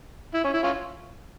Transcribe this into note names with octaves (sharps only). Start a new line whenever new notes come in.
E4
C#4
E4
C#4 F4